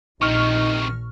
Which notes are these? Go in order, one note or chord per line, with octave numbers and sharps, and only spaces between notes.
A#1 C3 D#3 D#4 C#6 F6